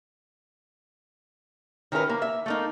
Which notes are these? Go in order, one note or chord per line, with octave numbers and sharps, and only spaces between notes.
D#3 C#4 E4 A#4 B4
A#3
E5
A3 A#3 D#4